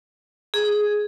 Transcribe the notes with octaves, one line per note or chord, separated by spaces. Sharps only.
G#4